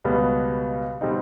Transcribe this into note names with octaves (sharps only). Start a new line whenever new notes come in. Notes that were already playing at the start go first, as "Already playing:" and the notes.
C#2 B2 G3 B3
B2 G3 C4 D#4